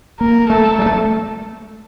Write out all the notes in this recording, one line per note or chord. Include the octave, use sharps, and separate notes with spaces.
A#3 A#4
A3 A4
G3
A3